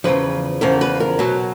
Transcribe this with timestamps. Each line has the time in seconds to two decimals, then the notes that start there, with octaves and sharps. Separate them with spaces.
0.04 E2 C#3 F3 B4
0.61 E2 C#3 F3 A#4
0.81 B4
1.00 A#4
1.19 B2 F#3